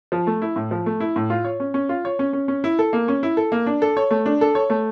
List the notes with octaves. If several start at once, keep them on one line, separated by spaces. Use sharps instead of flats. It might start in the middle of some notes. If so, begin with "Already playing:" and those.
F3
A3
E4
A2
F3
A3
E4
A2
F4
C#5
C#4
C#4
F4
C#5
C#4
C#4
C#4
E4
A4
A#3
C#4
E4
A4
A#3
D4
A4
C#5
A3
D4
A4
C#5
A3